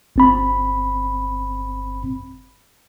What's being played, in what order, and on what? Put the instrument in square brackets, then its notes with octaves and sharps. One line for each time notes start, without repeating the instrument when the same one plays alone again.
[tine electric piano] G1 C4 B5